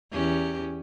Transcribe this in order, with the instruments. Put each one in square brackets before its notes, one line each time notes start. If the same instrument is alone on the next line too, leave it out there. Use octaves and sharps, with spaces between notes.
[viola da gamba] E2 C#4 G4